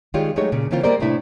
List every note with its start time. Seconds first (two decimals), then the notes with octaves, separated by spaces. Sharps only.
0.14 D#3 G3 G#3 F4 G4 C#5
0.36 F#3 G#3 A3 D#4 G4 C#5
0.52 A#2 C#3
0.71 C#3 E3 A#3 C4 F4
0.83 G3 G#3 A#3 A#4 C5 D5
1.00 A2 C3 A3 D4 E4